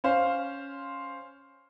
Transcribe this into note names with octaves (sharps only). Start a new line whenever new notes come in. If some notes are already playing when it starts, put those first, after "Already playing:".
C#4 C5 F5